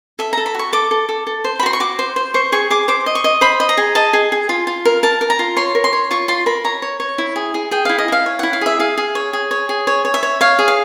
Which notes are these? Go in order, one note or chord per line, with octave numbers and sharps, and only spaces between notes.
A4 E5
A4 A#5
B5
F#4 C#6
A4 D6
A4
A4
A4
C5
B5
F#4 C6
C#6
F#4 D6
C5
C5
C5 C#6
G#4 C#6
G#4 D6
C5 D6
D#5
C#6
D#5
C5 B5
D#5
A#5
G#4
D#5 A5
G#4
G#4
F4
F4
A#4
A#4 A5
A#4
A#5
F4
C#5 C6
A#4
C6
C#5
F4 C#6
F4 C6
A#4 B5
C#5 A#5
C#5
C#5
E4
G#4
G#4
G#4 G5
E4 F5
D#5
E4 F5
C#5
E4 F#5
F5
G#4 E5
G#4 F5
G#4
C#5
G#4
C#5
G#4
C#5
C#5
E5
C#5
C#5 F5
G#4
F5